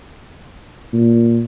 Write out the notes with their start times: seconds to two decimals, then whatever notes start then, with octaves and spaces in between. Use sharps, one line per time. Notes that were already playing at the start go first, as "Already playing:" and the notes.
0.93 A#2